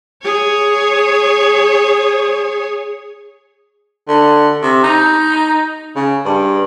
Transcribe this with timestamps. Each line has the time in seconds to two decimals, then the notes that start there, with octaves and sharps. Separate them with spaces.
0.23 G#4 C#5
4.08 D3
4.62 C3
4.83 D#4
5.96 C#3
6.26 G2